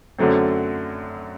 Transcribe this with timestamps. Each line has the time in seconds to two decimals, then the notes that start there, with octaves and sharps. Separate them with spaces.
0.18 F#2 D3 F#3 A3 C4